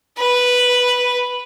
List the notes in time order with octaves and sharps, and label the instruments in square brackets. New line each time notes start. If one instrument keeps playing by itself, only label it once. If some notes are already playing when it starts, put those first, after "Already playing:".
[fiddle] B4